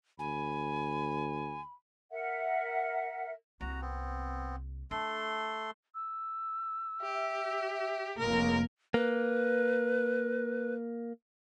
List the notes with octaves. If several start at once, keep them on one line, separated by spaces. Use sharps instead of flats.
D2 G#5 B5
A#4 E5 F#5
C2 A#3 F#4 A#5
B3 C4
A3 D4 A4 C6
E6
G4 E5
F1 C#2 A#3 A#4
A#3 B4